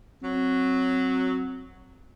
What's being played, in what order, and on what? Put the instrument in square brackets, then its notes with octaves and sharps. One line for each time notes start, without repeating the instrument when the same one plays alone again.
[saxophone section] F#3 [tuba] C4